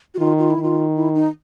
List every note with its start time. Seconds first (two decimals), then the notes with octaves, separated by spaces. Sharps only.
0.14 F#4
0.19 D#3 F4
0.38 F4
0.50 E4
0.58 D#3
0.63 F4
0.95 E4
1.15 D#4